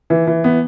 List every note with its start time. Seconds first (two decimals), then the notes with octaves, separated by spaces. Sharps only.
0.10 E3
0.27 E3
0.44 B3